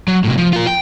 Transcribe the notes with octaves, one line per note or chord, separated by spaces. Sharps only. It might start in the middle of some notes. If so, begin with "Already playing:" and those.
F#3
A2 C3
F3
F4 A#4
G5